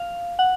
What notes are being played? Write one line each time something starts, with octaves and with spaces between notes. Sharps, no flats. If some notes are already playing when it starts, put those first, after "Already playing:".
Already playing: F5
F#5